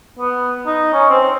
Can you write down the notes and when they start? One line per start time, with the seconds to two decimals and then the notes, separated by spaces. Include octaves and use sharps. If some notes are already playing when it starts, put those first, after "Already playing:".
0.19 B3
0.67 D#4
0.93 C#4
1.10 C4